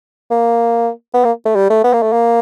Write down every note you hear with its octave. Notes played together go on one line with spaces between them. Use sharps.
A#3
B3
A#3
A3
G3
A3
B3
A#3
A3
A#3